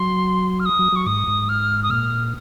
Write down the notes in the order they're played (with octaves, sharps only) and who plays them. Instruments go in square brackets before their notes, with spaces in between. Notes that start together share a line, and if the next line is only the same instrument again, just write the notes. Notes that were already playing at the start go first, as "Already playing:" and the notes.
Already playing: [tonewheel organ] F#3 [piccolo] C6
[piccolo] F6
D#6
[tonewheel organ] F#3
[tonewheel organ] F#3 [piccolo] C#6
[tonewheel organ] G#2 [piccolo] D#6
[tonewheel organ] G#2
[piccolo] F6
D#6
[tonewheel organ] A#2 [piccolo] F6